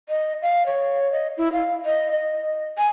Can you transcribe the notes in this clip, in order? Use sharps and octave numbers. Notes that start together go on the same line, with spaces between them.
D#5
F5
C#5
D#5
E4
F5
D#5
D#5
G#5